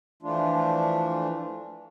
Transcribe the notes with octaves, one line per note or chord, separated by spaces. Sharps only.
E3 F3 A3 D4 F4